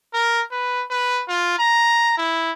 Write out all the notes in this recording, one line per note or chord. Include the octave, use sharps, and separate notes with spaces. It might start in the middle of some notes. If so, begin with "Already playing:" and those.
A#4
B4
B4
F4
A#5
E4